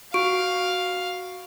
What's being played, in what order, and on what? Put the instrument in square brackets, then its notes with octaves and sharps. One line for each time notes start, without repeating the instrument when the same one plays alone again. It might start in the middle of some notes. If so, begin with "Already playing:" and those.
[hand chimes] F#4 C#6 D7 [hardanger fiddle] F5